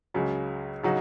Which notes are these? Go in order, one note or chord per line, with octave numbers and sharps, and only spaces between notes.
C#2 C#3 F#3
C#3 F#3 D#4 F#4